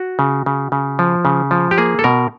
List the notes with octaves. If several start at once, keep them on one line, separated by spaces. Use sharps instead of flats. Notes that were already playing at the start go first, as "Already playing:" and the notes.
Already playing: F#4
C#3
C#3
C#3
F3
C#3
F3
G4
A#3 G#4
A4
B2 A#4